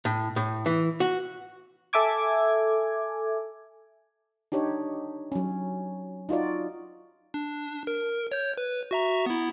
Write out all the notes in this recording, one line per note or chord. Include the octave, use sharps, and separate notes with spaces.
A2
A2
E3
F#4
A4 E5 G#5 D6 G#6
D4 D#4 G4 C#5
F#3 C#4
D#4 F4 F#4 D5
D4
A#4
C#5 G6
B4
F#4 E5 A#5
B3 E4